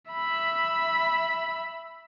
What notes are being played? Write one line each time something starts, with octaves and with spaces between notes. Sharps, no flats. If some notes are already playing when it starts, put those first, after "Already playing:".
E5 B5